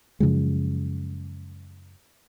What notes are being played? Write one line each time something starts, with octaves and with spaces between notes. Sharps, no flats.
F#2 C#3 F3 G#3